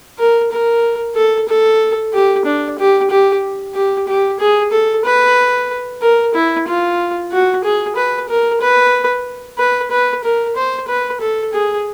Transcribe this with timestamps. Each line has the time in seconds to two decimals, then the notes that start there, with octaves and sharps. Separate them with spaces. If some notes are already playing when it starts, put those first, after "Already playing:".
0.19 A#4
0.52 A#4
1.16 A4
1.49 A4
2.13 G4
2.45 D4
2.79 G4
3.11 G4
3.75 G4
4.08 G4
4.40 G#4
4.72 A4
5.05 B4
6.02 A#4
6.34 E4
6.68 F4
7.32 F#4
7.64 G#4
7.96 B4
8.29 A#4
8.61 B4
9.58 B4
9.91 B4
10.24 A#4
10.57 C5
10.88 B4
11.21 A4
11.53 G#4